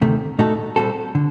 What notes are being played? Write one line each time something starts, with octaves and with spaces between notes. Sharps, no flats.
D2 C3 D#3 A3
A#2 A3 D#4 F#4 A4
A#2 G3 C4 F#4 A4
D3